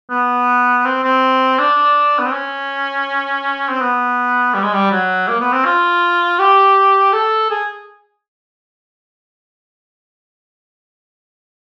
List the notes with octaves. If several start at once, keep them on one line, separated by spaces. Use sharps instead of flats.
B3
C4
C4
D4
B3
C4
C#4
C4
B3
G3
G#3
G3
F#3
A#3
B3
C4
F4
G4
A4
G#4